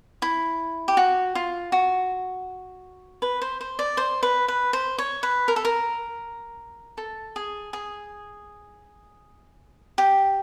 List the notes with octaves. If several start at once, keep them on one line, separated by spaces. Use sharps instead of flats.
E4
G4
F#4
F4
F#4
B4
C5
C5
D5
C5
B4
B4
C5
C#5
B4
A#4
A4
A#4
A4
G#4
G#4
G4